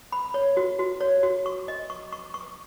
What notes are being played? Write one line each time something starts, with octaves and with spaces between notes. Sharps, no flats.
B5
C#5
F#4
F#4
C#5
F#4
C#6
D#5
C#6
C#6
C#6